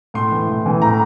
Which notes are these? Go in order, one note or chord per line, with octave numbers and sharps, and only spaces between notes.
A2 C6
E3
A2
E3
A2 A#5